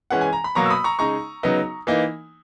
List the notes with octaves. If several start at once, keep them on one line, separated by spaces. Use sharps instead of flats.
E3 G#3 C#4 F#5
G#5
A#5
B5
B2 F#3 A#3 A#5 C#6
E6
B5 D#6
A#5 C#6
C#3 G#3 D#4 A#5 C#6
C#3 F#3 B3 D#4
E3 A#3 D#4